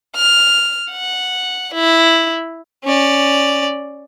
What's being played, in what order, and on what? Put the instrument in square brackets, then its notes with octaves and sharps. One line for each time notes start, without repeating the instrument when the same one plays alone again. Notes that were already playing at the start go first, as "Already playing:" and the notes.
[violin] F6
F#5
E4
[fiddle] C#4 D5